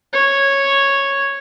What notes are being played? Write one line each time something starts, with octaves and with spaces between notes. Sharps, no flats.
C#5